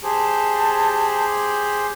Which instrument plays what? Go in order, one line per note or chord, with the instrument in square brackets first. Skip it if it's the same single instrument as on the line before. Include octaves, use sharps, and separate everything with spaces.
[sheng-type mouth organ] G4 G#4 C5 [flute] A5